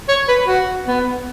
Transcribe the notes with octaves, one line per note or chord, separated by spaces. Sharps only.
C#5
B4
F#4
B3